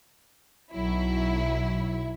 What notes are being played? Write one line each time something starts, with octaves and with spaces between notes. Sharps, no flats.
B1 F#3 E4